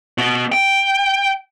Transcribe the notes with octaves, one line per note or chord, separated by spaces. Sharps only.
B2 B3
G5